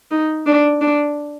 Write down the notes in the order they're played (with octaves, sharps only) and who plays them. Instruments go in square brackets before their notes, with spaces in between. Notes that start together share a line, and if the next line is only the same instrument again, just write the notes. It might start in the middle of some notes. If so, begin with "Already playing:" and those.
[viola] D#4
D4
D4